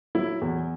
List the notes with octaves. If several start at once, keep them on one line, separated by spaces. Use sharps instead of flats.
F#3 E4
E2